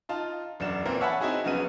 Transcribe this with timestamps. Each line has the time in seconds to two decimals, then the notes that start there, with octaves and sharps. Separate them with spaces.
0.09 D#4 F4 A5
0.60 E1 F#2 D4 E7
0.85 A#2 E3 A#3 C4
1.00 C#5 E5 F#5 G#5 A5 B5
1.20 C4 D#4 E4 F#4 G#4
1.44 A#1 C#3 F#3 B3 D#7